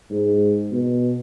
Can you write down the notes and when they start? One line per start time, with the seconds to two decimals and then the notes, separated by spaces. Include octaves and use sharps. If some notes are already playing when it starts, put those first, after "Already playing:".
0.10 G#2
0.72 B2